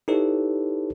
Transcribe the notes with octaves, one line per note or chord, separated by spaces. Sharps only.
D#4 E4 G4 A4 B4 C#5